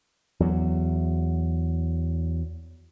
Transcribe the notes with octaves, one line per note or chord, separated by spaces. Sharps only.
E2 F#3